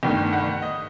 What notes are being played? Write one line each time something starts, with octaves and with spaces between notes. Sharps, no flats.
G1 G2 D#3 A3 G5
F#5
D#5